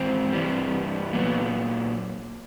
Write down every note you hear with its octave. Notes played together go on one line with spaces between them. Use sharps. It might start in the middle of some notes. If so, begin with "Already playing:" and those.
Already playing: G#2 E3 C4
G2 E3 G3
A#2 F#3 B3